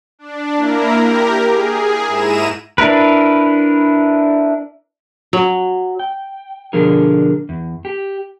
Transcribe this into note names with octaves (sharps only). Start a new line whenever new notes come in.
D4
A#3 E4 A#4
G4 A#4
G#4
G#2 E4 A#5 D#7 E7
D4 E4 A#4 B4
F#3
G5
B2 D3 F3 D4 G#4 A#4
E2
G4